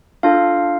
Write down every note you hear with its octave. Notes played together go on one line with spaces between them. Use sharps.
D4 F4 A4 F5